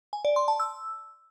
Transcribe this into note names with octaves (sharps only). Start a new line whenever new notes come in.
G#5
D5
C6
A5
E6